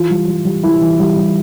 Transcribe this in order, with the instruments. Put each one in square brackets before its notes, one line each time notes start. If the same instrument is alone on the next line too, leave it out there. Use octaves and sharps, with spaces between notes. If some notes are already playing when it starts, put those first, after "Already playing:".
Already playing: [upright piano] E3 F4
G3
G3
G3
G3 E4
E3
G3
G3